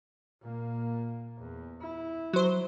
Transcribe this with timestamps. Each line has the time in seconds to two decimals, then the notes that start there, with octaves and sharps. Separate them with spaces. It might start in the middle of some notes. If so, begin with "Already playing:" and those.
0.41 A#2 A#3
1.38 E2
1.81 E4
2.33 F#3 C5